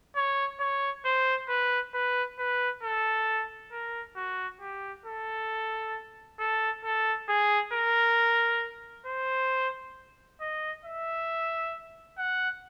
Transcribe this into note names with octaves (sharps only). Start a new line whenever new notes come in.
C#5
C#5
C5
B4
B4
B4
A4
A#4
F#4
G4
A4
A4
A4
G#4
A#4
C5
D#5
E5
F#5